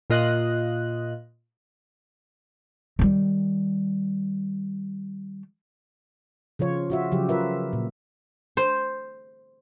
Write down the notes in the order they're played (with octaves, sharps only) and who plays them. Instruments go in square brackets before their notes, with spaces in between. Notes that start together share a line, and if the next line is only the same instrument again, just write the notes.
[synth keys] A#2 F4 D#5 F#6
[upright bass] D#3 G3
[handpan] C#3 F3 F4 C#5
F4 F#4 E5
C#3 F3 F#3 G4
F4 A#4 B4 E5
A#2
[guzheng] C5